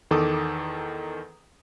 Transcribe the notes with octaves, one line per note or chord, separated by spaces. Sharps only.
E2 D#3 A4 D6 D#6